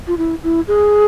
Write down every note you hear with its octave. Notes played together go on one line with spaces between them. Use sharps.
F4
E4
E4
G#4